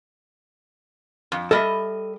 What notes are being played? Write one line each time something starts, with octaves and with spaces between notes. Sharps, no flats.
F2
G3 A4 D#5 E5